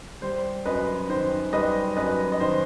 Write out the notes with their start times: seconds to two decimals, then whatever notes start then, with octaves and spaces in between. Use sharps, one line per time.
0.22 G3 C5
0.65 F#2 B4 D#5
1.09 D#3 C5
1.53 G3 B4 D#5
1.96 F#2 B4 D#5
2.32 D#5
2.40 D#3 C5